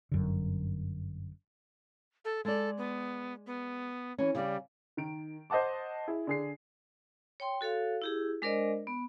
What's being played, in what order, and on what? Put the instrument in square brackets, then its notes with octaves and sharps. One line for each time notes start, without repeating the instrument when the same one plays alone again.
[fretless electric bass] G1 F#2 D3
[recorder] A4
[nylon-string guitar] G#3 D5 [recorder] A4
[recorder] B3
B3
[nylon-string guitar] E3 C#4
[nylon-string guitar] C#3 D5 [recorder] G3
[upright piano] D#3 D7
C5 D#5 F#5 A5 D6
E4 G#4
D3 G#4 C7
[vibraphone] C#5 G5 C6
F#4 A4 C#5 F5
E4 G4 G#4
G#3 D4 A#4 C5 D5 D#5
B3